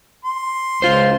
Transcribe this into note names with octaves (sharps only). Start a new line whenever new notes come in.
C6
C#2 F4 C5